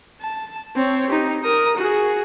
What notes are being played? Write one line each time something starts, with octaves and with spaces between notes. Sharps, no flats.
A5
C4 C#5
D#4 G4
A#4 D#6
F#4 G#4